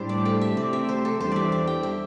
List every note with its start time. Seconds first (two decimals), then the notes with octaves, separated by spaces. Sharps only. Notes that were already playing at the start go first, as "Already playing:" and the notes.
Already playing: A2 G3 D4 E4 G4 C5
0.09 D5
0.25 A4
0.41 E5
0.56 C3 A3 C4 G4 D5
0.73 E5
0.89 C5
1.05 A4
1.20 E2 E3 G3 D4 G4 C5
1.32 D5 E5
1.52 D5
1.67 G5
1.83 E5